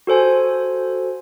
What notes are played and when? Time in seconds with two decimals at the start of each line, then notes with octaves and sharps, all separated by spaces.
0.07 F#4 A4 C5 G#5